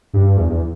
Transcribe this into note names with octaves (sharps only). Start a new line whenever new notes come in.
G2
E2
E2